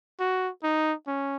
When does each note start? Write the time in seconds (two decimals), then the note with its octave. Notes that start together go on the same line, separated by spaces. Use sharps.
0.20 F#4
0.63 D#4
1.07 C#4